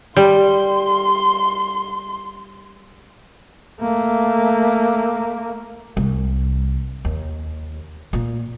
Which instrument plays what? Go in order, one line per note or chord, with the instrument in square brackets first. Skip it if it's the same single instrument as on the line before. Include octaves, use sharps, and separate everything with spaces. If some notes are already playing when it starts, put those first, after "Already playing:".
[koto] G3 [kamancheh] C6
[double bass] A3 A#3
[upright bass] C2
D#2
A#2